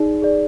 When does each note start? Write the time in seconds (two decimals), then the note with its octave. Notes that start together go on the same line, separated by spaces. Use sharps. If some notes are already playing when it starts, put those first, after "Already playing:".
Already playing: D#4 G#4 D5
0.22 G#4 D5